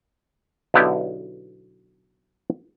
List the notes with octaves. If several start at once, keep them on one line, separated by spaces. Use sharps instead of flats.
B1 D3 B3 E4 G4